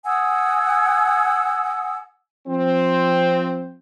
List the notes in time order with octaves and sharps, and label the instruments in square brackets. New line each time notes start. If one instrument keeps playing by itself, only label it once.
[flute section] F#5 G#5 D#6 E6
[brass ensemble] F3 C4